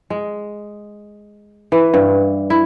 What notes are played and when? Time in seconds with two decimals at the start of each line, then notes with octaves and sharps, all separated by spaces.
0.10 G#3
1.72 E3
1.94 G2
2.50 E4